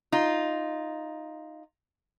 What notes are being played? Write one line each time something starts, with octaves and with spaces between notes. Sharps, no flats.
D#4 F4